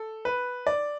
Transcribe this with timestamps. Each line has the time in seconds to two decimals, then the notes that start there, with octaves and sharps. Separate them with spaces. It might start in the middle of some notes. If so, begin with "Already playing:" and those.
Already playing: A4
0.25 B4
0.67 D5